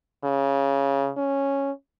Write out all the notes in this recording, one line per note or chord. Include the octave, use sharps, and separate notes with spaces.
C#3
C#4